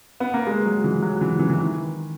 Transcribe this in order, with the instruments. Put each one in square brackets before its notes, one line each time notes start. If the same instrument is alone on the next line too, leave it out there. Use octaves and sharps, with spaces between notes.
[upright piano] B3
A#3
G#3
F#3
E3
F#3
E3
E3
E3
D#3